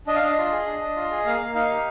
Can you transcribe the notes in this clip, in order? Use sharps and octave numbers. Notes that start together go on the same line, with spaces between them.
D4 D#5
F5
D4 D#5
F4
G#4
D4
D4
F4
G#4
A#3 F5
A#3
D#4 F5
G4